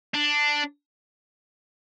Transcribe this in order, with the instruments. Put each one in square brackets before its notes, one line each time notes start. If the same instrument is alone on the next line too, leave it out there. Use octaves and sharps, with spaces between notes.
[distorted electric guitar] D4